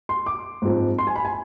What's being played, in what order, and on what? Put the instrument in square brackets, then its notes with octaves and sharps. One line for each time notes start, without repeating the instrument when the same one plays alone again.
[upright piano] C6
D6
G#2 F3 C4
C6
G#5
B5
G#5